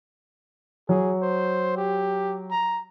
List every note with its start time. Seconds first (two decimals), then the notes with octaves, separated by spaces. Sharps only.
0.89 F#3 G#4
1.22 C5
1.77 G4
2.51 A#5